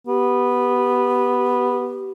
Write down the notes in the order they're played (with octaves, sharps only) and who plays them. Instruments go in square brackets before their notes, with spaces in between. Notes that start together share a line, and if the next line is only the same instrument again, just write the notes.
[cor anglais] B3 [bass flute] G4